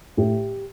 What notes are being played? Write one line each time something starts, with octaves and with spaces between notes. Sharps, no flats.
A2 G4